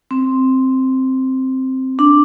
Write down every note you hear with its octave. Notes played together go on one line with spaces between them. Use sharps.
C4
D4